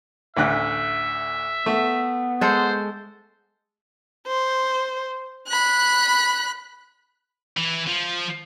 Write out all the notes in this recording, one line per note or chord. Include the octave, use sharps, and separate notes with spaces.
A1 D2 E5 F#6
A3 B3
G#3 A4 C5
C5
B5 F#6
E3
F3